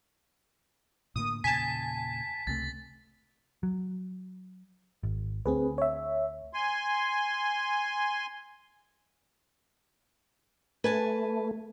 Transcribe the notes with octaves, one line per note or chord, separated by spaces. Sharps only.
A2 D3 A#3 D#6
E2 A#2 C#3 G#5 A5 B6
C#2 C3 A3 A6
F#3
G#1
D2 C4 G#4 B4
C#5 E5
G#5 C6
A3 B4 G#5 A5